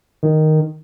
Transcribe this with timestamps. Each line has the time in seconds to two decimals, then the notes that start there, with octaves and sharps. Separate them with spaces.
0.23 D#3